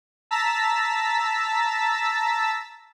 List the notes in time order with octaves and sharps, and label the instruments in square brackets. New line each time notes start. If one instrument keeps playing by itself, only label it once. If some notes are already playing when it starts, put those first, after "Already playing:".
[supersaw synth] A5 A#5 E6 A6 B6